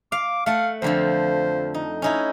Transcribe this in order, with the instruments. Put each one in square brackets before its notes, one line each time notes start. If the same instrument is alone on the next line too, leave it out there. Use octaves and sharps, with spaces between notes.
[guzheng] F5 [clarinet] D6
[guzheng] A3 F#5 A5 [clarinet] F5
[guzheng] F2 D3 F3 [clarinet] C5
[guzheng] D#4
C#4 D#4 E4